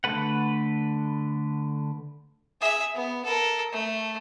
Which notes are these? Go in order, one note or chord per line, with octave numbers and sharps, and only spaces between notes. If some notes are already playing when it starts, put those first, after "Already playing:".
D3 A3 A4 B4 F#5
G#4 E5
B3
A4 A#4
A3